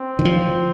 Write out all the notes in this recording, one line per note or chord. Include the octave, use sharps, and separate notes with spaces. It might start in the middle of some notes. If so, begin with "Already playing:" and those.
Already playing: C4
D#3
F3